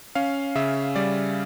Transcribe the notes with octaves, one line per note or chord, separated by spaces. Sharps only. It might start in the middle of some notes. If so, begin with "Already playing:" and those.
C#4 F5
C#3 E5
G3 D5